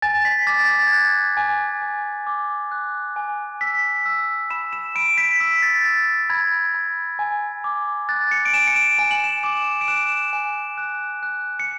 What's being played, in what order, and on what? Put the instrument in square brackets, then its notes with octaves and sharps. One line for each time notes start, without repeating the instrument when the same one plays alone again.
[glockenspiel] G#5 A6
B6
D6 A6
A6
G#6
F#6 A6
G#5
G#5
D6
F#6
G#5
E6 B6
E6
B5 E7
E7
B5 D7
B6
E6 B6
A6
E6 A6
B5 G#6
B5
G#5
D6
F#6 A6
C#7
D7
G#5 E7
C#7
D7
G#5 E7
F#7
E7
D6 E7
D7
F#6 E7
G#5
F#6
F#6
C#7